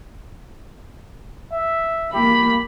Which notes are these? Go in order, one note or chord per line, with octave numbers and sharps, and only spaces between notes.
E5
A#3 G4 B5